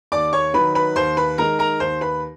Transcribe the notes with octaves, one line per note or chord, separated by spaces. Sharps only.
D#2 D5 D6
C#5 C#6
D#3 F#3 B4 B5
B4 B5
D#2 C5 C6
B4 B5
D#3 G#3 A#4 A#5
A#4 A#5
D#2 C5 C6
B4 B5